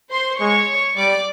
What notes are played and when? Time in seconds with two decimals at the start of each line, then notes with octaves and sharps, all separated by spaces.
0.11 C5 C6
0.39 G#3 C#5 C#6
0.96 G3 D5 D6